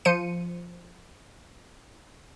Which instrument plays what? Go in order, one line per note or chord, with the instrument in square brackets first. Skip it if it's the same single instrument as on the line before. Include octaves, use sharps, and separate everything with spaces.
[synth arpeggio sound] F3 C5 C#7 D#7